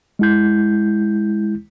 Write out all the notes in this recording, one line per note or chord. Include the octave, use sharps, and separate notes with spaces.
G#3 E4 G6